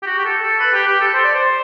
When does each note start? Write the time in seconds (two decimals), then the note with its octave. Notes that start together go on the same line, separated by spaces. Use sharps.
0.02 G4
0.06 F#4
0.18 G4
0.25 A4
0.43 A4
0.60 B4
0.74 G4
0.87 G4
1.01 A4
1.14 C5
1.24 D5
1.35 C5